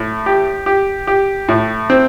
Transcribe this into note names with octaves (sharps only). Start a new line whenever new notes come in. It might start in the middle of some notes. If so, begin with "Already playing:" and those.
Already playing: A2
G4
G4
G4
A2
C4